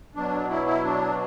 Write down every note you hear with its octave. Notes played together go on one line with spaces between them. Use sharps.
B2 F#3 D4
E4
E4
D4